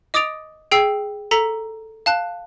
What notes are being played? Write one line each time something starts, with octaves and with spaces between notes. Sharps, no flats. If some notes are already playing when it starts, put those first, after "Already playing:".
D#5 D6 D#6 A6 D7 F7
G#4 G5 E6 C7
A4 A#5 B6 C#7
F5 A5 F#6